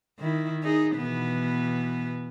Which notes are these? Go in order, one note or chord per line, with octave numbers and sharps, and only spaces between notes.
D#3 E4
D#4 G#4
B2 E3 B3